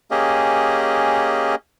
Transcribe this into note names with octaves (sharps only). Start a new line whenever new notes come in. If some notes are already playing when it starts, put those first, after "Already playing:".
A#3 C#4 G4 G#4 D#5